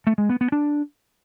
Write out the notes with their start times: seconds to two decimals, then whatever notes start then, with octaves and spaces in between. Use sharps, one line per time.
0.07 A3
0.18 G#3
0.29 B3
0.41 B3
0.52 D4